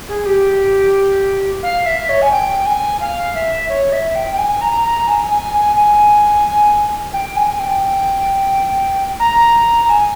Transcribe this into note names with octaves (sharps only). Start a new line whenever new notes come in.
G#4
G4
F5
E5
C#5
G#5
G5
G#5
F5
E5
C#5
E5
G5
G5
G#5
A#5
A#5
G#5
G#5
G#5
G#5
G5
G#5
G5
A#5
G#5